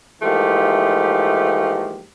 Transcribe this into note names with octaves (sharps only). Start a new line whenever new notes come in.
G#2 E3 F3 A3 A#3 G4